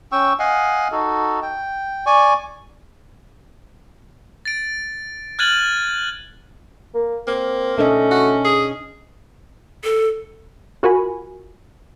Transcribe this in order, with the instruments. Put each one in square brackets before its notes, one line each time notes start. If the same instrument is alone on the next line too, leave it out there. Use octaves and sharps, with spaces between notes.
[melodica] C#4 G5 C#6 E6
D#5 F5 F#5 G#5
D#4 F#4 A4
G5
D5 G#5 C#6
[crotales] A6 D7
F6 F#6 G#6 A6 D#7 F#7
[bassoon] A#3
[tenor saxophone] A#3 [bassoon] C4
[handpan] B2 D4 D#5 [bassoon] A3 [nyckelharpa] C#4
[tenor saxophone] F#4
G#4
[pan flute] A4
[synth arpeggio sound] F4 F#4 A#4 G#5 B5